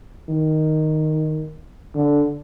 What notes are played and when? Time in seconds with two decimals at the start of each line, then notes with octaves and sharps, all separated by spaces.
0.29 D#3
1.95 D3